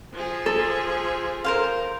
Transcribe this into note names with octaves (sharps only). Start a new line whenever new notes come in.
F3 G#4
A4
A#4 C5 F5